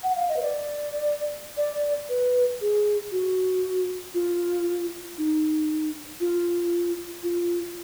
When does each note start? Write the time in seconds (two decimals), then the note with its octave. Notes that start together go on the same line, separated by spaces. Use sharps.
0.03 F#5
0.16 F5
0.29 D#5
0.37 B4
0.42 D5
1.57 D5
2.09 B4
2.61 G#4
3.12 F#4
4.14 F4
5.18 D#4
6.20 F4
7.23 F4